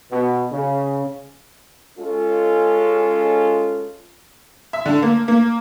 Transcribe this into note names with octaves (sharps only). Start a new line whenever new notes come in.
B2
C#3
G#3 C#4 F4 A4
E5
D3
A#3
A#3